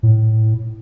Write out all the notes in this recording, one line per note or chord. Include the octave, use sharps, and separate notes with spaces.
A2